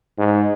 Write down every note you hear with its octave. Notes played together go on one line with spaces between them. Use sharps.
G#2